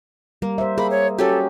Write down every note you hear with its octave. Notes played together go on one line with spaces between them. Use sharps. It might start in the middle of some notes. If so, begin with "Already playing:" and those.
G3 A#3
C5 E5
A#3 G#4 B5
C#5
F#3 C#4 G4 A4